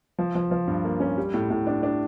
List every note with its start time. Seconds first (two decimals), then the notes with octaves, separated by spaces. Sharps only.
0.18 F3
0.35 F3
0.51 F3
0.67 G2
0.85 A#3
1.00 C#4
1.18 G3
1.34 A2
1.50 A2
1.67 D4
1.83 D4